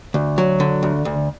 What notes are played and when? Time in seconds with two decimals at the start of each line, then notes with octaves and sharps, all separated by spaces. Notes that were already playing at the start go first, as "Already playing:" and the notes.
0.14 D2
0.38 F#3
0.60 D3
0.83 D2
1.05 D2